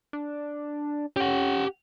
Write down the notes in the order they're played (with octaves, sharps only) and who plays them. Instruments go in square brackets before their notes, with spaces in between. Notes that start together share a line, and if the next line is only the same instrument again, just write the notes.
[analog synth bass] D4
[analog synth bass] C#4 [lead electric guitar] G4 F#5